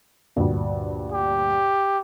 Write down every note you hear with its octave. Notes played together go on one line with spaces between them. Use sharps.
D2 G2 A#2
G4